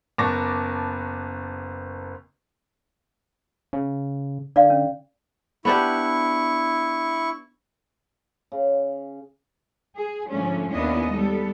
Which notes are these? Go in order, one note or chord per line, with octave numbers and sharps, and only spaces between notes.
F#1 B3 A5 C#6 D6 A#6
C#3
D3 D5 F5
C#4
B3 D4 E4 G4 C#6
C#3
G#4
G#2 D3 F3 A3 C#4
D#2 B3 C#4 D4 E4 D#5
G3 G#3 B3 A4